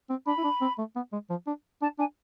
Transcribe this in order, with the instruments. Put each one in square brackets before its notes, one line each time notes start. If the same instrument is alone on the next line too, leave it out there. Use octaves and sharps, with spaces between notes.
[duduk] C4
[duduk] D4 [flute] B5
[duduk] E4
D4
C4
A3
B3
G#3
F3
D4
[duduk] D4 [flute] A5
[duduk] D4 [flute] G#5